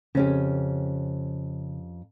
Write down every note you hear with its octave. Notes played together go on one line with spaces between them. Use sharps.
F2 C#3 C#4 G4